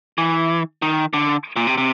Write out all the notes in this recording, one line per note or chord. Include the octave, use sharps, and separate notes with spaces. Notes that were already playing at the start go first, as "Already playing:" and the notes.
E3
D#3
D3
A#2
C3
C3